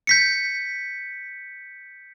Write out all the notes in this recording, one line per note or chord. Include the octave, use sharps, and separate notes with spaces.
G6 B6 C#7